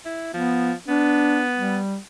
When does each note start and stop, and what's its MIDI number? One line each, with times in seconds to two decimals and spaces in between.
0.05 0.31 64
0.34 0.74 53
0.34 0.71 59
0.88 1.78 59
0.88 1.43 62
1.58 1.96 55